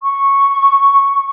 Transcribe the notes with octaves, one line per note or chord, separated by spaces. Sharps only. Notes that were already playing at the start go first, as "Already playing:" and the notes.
C#6